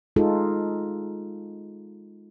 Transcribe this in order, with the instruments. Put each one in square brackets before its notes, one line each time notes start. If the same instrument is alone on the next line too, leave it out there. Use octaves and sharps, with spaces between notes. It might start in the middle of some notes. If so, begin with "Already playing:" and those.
[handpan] G#3 D#4 F4 G#4 A4